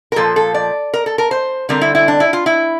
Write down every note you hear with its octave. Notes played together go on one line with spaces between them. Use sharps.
A#4
A#2 F3 A#3 A4
A4
D5
A#4
A4
A#4
C5
D3 G3 C4 A#4
E4
E4
D4
E4
F4
E4